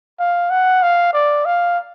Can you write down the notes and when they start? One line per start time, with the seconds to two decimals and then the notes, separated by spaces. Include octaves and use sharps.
0.20 F5
0.50 F#5
0.83 F5
1.13 D5
1.45 F5